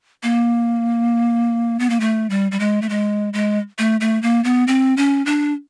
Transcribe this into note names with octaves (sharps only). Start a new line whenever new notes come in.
A#3
B3
A#3
A3
G3
G3
G#3
A3
G#3
G#3
A3
A3
A#3
B3
C4
C#4
D4